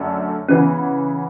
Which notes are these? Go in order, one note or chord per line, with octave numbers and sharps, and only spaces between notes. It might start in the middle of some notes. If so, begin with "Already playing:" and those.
Already playing: F#2 D3 A3
C#3 E3 B3 C#4